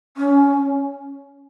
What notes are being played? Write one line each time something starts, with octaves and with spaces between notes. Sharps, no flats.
C#4